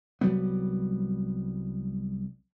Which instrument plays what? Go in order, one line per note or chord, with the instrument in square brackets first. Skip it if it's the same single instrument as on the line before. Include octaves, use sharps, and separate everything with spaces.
[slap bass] C2 F#3 G3 B3